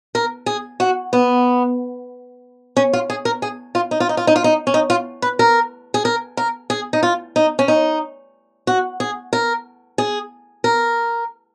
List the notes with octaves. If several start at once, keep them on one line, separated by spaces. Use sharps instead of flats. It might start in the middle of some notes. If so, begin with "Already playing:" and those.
A#4
G#4
F#4
B3
C#4
F4
G#4
A#4
G#4
F4
D#4
F4
D#4
F4
D#4
F4
D#4
C#4
D#4
F4
B4
A#4
G#4
A#4
A#4
G#4
D#4
F4
D#4
C#4
D#4
F#4
G#4
A#4
G#4
A#4